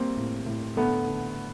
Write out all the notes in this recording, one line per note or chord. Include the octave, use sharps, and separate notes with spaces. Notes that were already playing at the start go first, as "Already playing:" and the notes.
Already playing: G3 A#3 C4
A2
A2
D3 A3 B3
D3